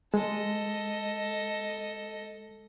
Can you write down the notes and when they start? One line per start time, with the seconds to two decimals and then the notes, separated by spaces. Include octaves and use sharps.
0.14 G#3 A4 D#5